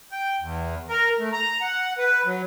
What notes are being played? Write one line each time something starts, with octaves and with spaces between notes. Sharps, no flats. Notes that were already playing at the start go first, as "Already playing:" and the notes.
G5
E2
A#4
A3
A#5
F#5
B4
F#3